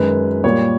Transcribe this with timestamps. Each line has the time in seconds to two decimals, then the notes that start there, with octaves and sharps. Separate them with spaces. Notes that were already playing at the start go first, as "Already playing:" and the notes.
Already playing: F#2 D#3 G#3 B4
0.44 A#2 G3 C#5